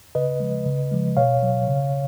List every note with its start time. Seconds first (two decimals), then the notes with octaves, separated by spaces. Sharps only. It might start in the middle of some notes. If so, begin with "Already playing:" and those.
0.15 C#3 B4 D#5
0.40 F3 G#3
0.66 C#3
0.92 F3 G#3
1.17 B2 C#5 F5
1.43 F#3
1.68 C#3